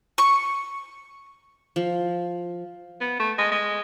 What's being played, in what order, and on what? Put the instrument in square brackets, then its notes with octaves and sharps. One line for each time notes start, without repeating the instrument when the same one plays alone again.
[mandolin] C#6
[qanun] F3
[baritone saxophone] B3
A3
G#3
G#3